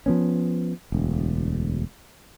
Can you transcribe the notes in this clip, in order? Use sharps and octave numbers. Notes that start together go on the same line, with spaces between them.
F3 B3 C#4
E1 D2